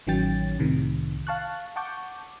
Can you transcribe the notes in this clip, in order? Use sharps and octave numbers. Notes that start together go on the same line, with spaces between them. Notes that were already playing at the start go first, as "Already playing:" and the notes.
A1 D#3 F#3 C#4 G5 A6
C2 A2 C3 D#3
F5 A5 C#6 F#6
F#5 A5 C#6 D6 G6